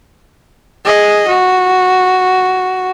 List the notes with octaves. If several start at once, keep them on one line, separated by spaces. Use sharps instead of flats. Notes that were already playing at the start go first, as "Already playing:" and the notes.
G#4 D#5
F#4